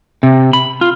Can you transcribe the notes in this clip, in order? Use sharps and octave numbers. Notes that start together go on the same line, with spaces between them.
C3
B5
F4